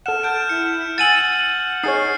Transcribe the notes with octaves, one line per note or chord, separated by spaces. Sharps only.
A4 F#5 F6 E7
A5 F6 G6 D7
E4 C#7
F#5 G#5 E6 A6 D#7 F#7
D#4 G#4 C#5 F6 A6 C7